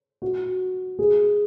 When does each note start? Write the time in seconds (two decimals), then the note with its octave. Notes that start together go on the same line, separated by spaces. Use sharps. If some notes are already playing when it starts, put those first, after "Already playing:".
0.22 F#4
0.99 G#4